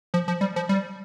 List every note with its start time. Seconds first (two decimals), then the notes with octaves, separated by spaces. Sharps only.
0.14 F3
0.28 F3
0.41 G3
0.56 F3
0.69 G3